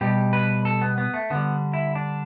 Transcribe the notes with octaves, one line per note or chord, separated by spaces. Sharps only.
B2 G3 G4
B4
A4
B3
B3
A3
D3 G3 B3
E4
D4